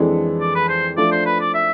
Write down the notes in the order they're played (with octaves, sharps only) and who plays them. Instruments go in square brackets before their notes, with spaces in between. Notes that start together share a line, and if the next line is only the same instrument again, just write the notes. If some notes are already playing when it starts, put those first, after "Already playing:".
Already playing: [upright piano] F2 E3 G#3 D4 A4
[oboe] D5
B4
C5
[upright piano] F3 A3 D4 [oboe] D5
[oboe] C5
B4
D5
E5